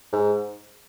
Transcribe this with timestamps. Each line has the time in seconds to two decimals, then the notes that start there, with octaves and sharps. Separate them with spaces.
0.12 G#2